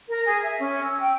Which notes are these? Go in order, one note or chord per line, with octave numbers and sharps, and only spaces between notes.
A#4
G#4
E5
C#4
E6
G5